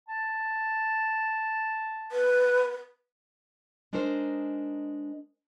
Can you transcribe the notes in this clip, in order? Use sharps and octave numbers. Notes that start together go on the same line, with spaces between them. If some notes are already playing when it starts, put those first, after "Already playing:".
A5
B4
G#3 D4 D#4 A#4 C5